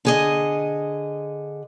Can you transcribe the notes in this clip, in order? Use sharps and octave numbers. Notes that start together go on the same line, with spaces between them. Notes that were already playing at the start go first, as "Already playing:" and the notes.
D3 G#4 D#5